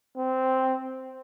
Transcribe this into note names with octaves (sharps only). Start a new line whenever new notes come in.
C4